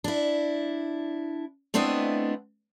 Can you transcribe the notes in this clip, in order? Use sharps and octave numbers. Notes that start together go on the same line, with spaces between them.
D4 E4
A3 B3 C4 D4 E4 D#5